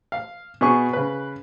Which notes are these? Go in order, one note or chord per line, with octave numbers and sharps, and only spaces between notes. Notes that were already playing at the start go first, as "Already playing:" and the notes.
F5
B2 G#4 B4 C#6
C#3 B4